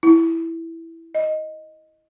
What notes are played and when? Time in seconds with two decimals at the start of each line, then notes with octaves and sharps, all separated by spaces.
0.03 E4
1.15 D#5